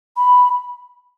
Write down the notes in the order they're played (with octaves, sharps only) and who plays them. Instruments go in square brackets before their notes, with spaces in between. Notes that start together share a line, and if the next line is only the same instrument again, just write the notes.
[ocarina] B5